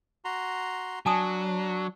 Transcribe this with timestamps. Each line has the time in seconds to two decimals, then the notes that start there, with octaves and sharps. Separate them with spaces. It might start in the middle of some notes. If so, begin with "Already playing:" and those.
0.25 F#4 A#5 C6
1.06 F#3 D4 G#5 A5 D#6